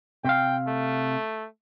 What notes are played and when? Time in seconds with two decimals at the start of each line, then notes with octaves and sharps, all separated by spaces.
0.25 C3 F5 G5
0.68 A3